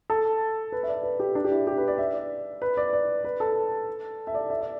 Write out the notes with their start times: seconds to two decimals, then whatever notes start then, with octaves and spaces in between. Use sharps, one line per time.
0.10 A4
0.72 B4
0.83 E5
0.88 D5
1.03 B4
1.20 G4
1.35 D4
1.45 G4
1.51 E4
1.67 G4
1.78 B4
1.88 D5
1.98 E5
2.14 D5
2.62 B4
2.77 D5
2.93 D5
3.24 B4
3.40 A4
4.27 E5
4.35 D5
4.50 E5
4.61 D5